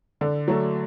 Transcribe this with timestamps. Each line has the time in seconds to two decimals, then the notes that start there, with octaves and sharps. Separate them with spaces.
0.21 D3
0.48 F#3 A3